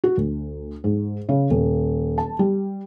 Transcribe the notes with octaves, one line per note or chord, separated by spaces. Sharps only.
F#4
D2
G#2
C#3
D#1
A5
G3